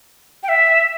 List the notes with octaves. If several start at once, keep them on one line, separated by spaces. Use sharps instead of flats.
G5
E5